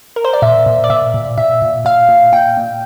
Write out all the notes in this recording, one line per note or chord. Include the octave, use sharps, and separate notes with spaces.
A#4
C5
D5
A#2 E5
A#2
D5
A#2 E5
A#2
A#2 E5
A#2
A#2 F5
A#2
A#2 G5
A#2